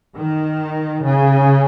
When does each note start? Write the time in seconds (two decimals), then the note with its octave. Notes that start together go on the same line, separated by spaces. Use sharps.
0.16 D#3
1.05 C#3